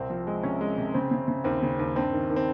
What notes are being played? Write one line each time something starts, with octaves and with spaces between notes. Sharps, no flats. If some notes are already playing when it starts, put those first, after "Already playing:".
Already playing: C2 C4
F3
G#3
C3 C#4
G#3
C3
C#3 C4
C#3
C#3
D#2 C4
C#3
D#2
G2 C4
D#3
D#3
C4